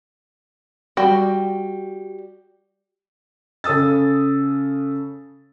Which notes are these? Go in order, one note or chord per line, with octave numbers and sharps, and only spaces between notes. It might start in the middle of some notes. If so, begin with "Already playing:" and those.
G3 F#4 G5
C#3 A4 D#6 E6 A6